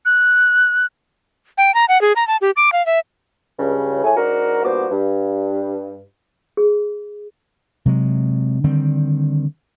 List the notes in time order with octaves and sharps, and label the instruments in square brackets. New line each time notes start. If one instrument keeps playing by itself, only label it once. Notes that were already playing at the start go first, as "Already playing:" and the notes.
[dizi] F#6
[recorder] G5
A#5
F#5
G#4
A#5
A5
G4
D6
F5
E5
[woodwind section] C#2 G2 C#3
A2 A3 G#5
G#2 D4 F#4 A#4
G2 A#2 B3 F#4 C5 D6
G2
[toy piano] G#4
[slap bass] C3 F#3 G#3
D3 D#3 G3 C4